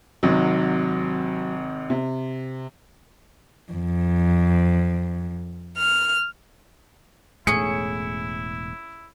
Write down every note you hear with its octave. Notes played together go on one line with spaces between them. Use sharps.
G#1 C3 D#3 F#3
C3
F2
F6
E1 A2 A3 C#4 E4 G#4 C#7